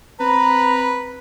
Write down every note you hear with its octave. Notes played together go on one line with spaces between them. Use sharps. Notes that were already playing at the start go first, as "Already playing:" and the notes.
C4 B4 A#5 B5